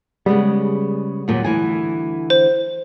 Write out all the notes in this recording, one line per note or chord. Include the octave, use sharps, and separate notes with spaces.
C#3 G3 G#3 B3
D#2 A#2 F#3
D2 E3 G#5
C5